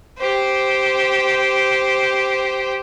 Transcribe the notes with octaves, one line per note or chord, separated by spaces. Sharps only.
G4 C5